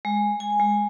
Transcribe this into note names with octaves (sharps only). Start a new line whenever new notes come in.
G#3
G#5
G#3